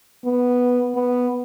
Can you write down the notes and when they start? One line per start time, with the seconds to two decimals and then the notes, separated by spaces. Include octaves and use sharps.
0.25 B3
0.95 B3